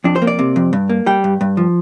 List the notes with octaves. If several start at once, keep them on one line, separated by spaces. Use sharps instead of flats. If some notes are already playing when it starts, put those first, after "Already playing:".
F2 D4
C5
A#3
D5
C3
F2
G2
A#3
G3 G5
G2
G2
F3